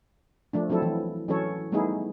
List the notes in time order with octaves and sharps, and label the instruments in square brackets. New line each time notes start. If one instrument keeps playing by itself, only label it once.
[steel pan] F3 A3 D4
F3 F#3 C4 E4 A4
E3
E3 F#3 C#4 A4 C#5
G3 A3 B3 D#4 E4 G#4